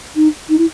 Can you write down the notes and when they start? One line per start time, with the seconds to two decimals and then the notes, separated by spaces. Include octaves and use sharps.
0.16 D#4
0.49 D#4
0.58 E4